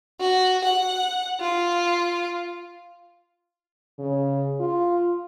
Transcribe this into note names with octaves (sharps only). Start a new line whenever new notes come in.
F#4
F#5
F4
C#3
F4